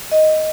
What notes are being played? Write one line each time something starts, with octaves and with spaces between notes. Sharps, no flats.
D#5